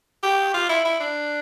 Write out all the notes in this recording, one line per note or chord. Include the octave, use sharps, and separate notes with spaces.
G4
F4
E4
E4
D4